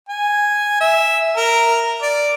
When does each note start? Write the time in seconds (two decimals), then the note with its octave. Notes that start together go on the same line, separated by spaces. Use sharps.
0.09 G#5
0.81 E5
1.37 A#4
2.02 D5